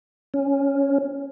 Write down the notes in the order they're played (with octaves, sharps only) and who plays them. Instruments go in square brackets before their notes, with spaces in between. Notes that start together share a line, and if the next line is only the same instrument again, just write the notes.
[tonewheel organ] C#4